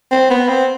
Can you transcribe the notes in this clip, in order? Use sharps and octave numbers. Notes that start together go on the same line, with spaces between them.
C4
B3
C4